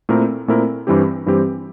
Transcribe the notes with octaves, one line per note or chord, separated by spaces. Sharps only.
A#2 A3 C4 E4 A#4
A#2 A3 C4 E4 A#4
G2 E3 G3 C4 G4
G2 E3 G3 C4 G4